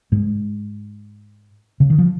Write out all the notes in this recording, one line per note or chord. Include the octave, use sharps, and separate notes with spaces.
G#2 G#3
C#3
D#3
F3